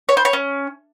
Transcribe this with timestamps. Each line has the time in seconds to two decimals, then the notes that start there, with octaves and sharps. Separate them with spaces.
0.09 C#5
0.17 C5
0.25 C#5
0.33 C#4